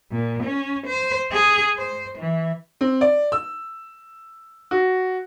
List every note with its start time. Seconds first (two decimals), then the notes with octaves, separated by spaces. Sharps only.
0.12 A#2
0.43 C#4
0.86 C5
1.32 G#4
1.76 C5
2.18 E3
2.81 C4
3.01 D5
3.32 E6
4.71 F#4